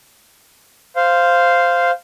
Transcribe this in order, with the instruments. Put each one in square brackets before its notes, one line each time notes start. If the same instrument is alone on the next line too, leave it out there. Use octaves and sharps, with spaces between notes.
[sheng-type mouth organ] C5 F5